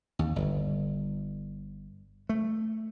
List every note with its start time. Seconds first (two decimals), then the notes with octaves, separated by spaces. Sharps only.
0.19 D#2
0.36 G1
2.29 A3